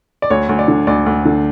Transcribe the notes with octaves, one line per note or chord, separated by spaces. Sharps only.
D5
D2 C#5
D2
D5
D3
D2 D5
D2
D3